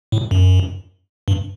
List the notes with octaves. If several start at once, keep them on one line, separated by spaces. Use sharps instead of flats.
A2
F#2
G2